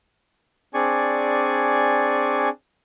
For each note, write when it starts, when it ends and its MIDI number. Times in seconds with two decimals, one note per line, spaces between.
0.74 2.49 60
0.74 2.49 62
0.74 2.49 68
0.74 2.49 74
0.74 2.49 80
0.74 2.49 85